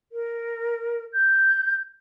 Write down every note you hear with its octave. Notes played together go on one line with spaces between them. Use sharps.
A#4
G6